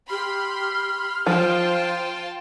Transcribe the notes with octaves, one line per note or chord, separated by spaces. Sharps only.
G4 B5 C6 F6
F3 F4 C5 G5 A5